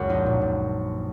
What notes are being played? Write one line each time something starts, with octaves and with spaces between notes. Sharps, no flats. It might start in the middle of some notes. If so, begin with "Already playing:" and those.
Already playing: F#1 C#2 F#2 F#4 A#4 F#5
A#1 D#4
A#2
A#2